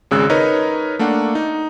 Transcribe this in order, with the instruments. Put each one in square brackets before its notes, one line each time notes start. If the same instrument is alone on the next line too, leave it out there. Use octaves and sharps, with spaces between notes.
[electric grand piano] G#1 C#3 G#3 E6 F#6
D#4 A#4 B4 C#5 D#5
A3 A#3 D4 F#5
D#4